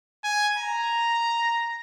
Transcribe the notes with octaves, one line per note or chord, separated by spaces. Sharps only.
G#5
A#5